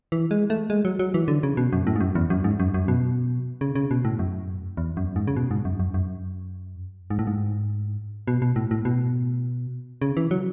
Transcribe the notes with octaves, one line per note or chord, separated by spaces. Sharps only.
E3
G#3
A3
G#3
F#3
F#3
E3
D3
C#3
B2
F#2
A2
G#2
F#2
E2
F#2
G#2
F#2
F#2
B2
C#3
C#3
B2
A2
F#2
E2
F#2
G#2
C#3
B2
G#2
F#2
F#2
F#2
G#2
A2
G#2
B2
B2
A2
A2
B2
C#3
E3
F#3